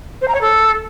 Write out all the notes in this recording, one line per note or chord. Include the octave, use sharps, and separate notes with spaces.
C5
A#5
C#5
A4